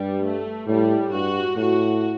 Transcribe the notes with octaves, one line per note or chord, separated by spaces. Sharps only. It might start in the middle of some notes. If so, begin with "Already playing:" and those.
Already playing: G2 G3
A3
A2 G3
G2 F#4
A2 F#4